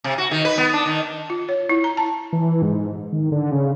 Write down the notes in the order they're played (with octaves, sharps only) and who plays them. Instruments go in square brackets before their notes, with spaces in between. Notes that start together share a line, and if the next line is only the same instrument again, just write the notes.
[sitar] C3
F#4
D#3
B4
B3
D4
D#3
[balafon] F4
C#5
E4
A#5
A5
[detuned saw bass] E3
G#2
D#3
D3
C#3